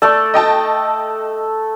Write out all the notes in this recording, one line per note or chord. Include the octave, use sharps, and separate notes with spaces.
A3 A4 D5
D#5 G5 A5